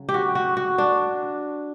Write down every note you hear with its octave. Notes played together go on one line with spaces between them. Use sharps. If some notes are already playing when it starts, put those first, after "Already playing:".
Already playing: C#3 F#3
G4
F#4
F#4
F#4
D4